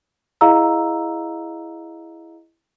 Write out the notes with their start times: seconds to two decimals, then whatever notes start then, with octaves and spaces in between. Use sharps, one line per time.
0.41 E4 G#4 D#5 F5 A#5 E6